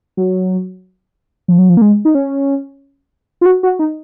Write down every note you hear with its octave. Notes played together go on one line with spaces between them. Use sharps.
F#3
F3
F#3
F3
A#3
G#3
D#4
C#4
F4
F#4
F#4
D#4